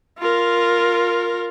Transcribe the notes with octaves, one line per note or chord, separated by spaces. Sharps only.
F4 A#4